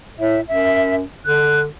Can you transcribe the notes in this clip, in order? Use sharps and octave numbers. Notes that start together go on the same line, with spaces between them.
A2 E5
F#2 E5
D3 F#6